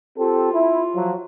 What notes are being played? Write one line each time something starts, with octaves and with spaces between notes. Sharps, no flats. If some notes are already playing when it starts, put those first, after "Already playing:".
C4 F4 G4 A4
E4
F3 F#3